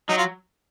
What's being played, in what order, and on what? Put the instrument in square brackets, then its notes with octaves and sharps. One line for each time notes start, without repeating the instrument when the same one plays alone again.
[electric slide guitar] F#3 [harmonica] D#4
[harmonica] F4